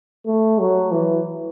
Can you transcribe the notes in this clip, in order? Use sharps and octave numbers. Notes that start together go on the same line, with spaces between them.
A3
F#3
E3